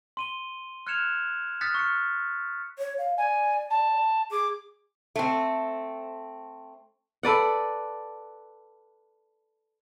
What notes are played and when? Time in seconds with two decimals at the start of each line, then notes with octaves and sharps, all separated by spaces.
0.17 C6 D#7 G7
0.87 F6 F#6 G#6 C#7 E7 F7
1.61 D#6 F6 F#6 A6 B6 C#7
1.74 C#6 F6 C#7
2.78 C#5
2.98 F5
3.17 D5 G#5
3.70 A5
4.31 G#4 D6
5.16 A3 C4
7.23 A4 B4 D5 F#5